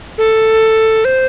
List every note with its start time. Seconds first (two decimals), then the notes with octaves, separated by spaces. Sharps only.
0.18 A4
1.05 C5